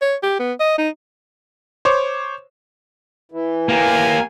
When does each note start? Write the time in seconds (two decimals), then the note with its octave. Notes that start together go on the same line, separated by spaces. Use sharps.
0.02 C#5
0.23 G4
0.39 B3
0.60 D#5
0.78 D#4
1.85 C5 C#5 D6
3.32 E3
3.69 A#3 G4 G#5